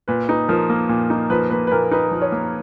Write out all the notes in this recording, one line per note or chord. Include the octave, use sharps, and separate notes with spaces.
A#2 B4
D#4 B4
F3 A#4
A#3
A#2
D#4
F3 B4
A#3 B4
B4
A#2 A#4
D#4 B4
F3
C#5
A#3